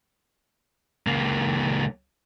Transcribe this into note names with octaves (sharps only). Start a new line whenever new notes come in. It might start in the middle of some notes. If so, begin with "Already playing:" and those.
C#2 A#3